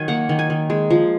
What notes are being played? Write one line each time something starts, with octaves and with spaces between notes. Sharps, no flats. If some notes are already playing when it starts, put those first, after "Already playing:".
Already playing: D#3 F#3 G#5
A#3 F#5
D#3
G#5
D#3
G#3
F3